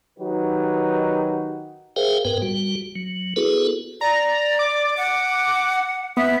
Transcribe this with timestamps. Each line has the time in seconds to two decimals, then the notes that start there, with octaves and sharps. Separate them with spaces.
0.19 D#3 F#3 D#4 F#4 G4 B4
1.96 G#4 A#4 C5 E5 F5 G5
2.25 G#2 B3 A#4 B4 G5
2.42 G3 F#4
2.96 F#3
3.36 B3 E4 F#4 G#4 A4 B4
4.01 D5 A#5
4.59 D6
4.97 F#5
6.17 B3 E5